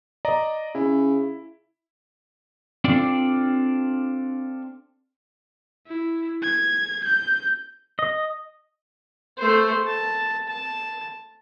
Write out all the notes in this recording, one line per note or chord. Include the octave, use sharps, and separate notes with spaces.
D5 D#5 A#5
C#3 E4
C4 D4 F4 A4 D5
E4
G#6
G6
D#5
A3 C5
A5
A5